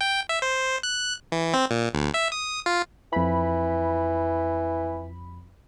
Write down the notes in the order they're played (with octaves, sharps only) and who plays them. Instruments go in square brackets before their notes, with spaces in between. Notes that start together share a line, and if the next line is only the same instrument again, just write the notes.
[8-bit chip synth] G5
E5
C5
F#6
E3
C4
A#2
D2
E5
D#6
F4
[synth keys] F2 B5 [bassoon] E3